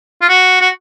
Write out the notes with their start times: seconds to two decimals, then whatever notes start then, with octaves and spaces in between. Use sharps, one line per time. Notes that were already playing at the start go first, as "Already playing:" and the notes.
0.22 F4
0.29 F#4
0.61 F#4